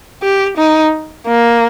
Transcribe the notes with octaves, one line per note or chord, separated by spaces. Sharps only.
G4
D#4
A#3